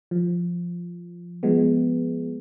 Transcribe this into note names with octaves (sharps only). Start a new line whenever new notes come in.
F3
F3 G#3 B3